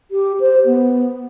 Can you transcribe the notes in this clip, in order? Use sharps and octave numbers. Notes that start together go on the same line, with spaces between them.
G4
C5
B3